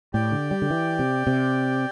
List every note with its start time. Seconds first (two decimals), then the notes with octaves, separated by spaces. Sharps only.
0.14 A2 G4 D5 G5
0.32 D3
0.51 G3
0.62 D3
0.70 E3
0.99 C3
1.27 C3